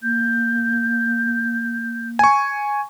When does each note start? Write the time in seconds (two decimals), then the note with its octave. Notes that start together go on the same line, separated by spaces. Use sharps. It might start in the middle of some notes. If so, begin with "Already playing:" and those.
0.02 A#3 G6
2.19 G#5 C#6